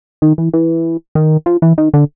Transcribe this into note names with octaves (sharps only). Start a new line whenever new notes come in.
D#3
E3
E3
D#3
F3
E3
D#3
D3